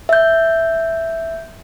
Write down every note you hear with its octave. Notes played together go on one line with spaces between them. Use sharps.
E5 G6